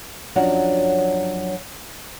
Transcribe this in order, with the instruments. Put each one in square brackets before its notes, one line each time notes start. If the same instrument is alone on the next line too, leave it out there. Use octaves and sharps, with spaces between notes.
[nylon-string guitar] F#2 F3 F#3 D4 C#5 F#5